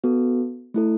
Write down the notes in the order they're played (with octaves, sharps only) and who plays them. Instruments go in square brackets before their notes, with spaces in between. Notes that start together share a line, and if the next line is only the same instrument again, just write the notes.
[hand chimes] B3 F#4 A4
A3 E4 A4